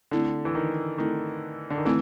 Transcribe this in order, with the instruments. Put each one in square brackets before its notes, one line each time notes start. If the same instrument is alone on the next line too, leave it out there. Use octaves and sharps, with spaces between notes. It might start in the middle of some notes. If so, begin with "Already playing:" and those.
[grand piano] D3 [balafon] A3 C4 E4 A4
[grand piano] E3
D#3
[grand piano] D#3 [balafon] A3 C4 E4 A4
[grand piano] D3
D#3
[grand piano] E3 [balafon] A3 C4 E4 A4